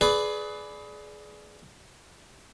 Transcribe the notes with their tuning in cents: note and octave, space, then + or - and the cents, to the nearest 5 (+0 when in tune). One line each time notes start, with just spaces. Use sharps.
G#4 +25 B4 +10 D5 +0